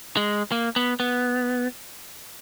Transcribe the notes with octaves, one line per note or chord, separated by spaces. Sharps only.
G#3
A#3
B3
B3